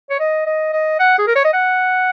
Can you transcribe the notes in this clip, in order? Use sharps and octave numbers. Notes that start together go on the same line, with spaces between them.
C#5
D#5
D#5
D#5
F#5
G#4
A#4
C#5
D#5
F#5